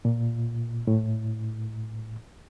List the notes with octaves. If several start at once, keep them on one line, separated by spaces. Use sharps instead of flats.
A#2
A2